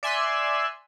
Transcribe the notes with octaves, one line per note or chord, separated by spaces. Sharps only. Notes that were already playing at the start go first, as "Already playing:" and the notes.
D5 E5 G#5 C6 E6 F#6